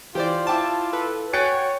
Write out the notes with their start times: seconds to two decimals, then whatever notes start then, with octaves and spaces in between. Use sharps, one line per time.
0.15 E3 F4 G4 C5 D5
0.47 E4 G5 A5 D6
0.93 A4 B4
1.33 F#4 C#5 G5 G#5 F#6 A6 C#7